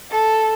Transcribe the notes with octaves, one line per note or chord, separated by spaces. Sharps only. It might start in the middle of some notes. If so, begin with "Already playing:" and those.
A4